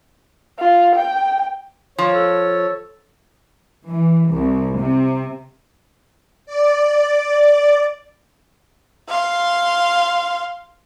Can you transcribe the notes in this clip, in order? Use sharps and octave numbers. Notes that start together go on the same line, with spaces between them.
F4
G5
F3 C#5
A4
E3
C2
C3
D5
F5 C6